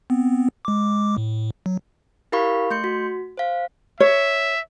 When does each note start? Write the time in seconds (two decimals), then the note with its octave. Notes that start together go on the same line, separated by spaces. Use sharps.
0.10 B3 C4
0.65 G#3 D6
1.18 A2
1.66 F#3
2.32 E4 G4 A#4 F5 B5 C#6
2.70 A3 C6 G6 C#7
2.84 F#4
3.37 C5 F5
4.00 C#5 E5